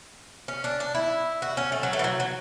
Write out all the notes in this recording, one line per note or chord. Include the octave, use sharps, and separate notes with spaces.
C#4
D4
D4
E4
F#4
C#4
A3
F#3
A3
E3
F#3
F#3